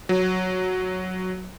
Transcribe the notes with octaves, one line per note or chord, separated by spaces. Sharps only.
F#3